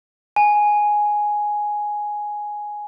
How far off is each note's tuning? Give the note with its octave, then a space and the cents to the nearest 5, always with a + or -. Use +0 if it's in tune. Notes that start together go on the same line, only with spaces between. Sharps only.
G#5 +5